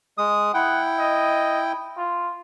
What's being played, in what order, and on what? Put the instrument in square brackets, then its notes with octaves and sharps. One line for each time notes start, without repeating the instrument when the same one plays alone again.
[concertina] G#3 D#6
[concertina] E4 G5 [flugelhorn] F#5
[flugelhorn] D#5
F4